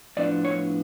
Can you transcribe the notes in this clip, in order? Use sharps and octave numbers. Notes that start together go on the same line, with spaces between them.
A2 F3 B3 D4 D5
C#5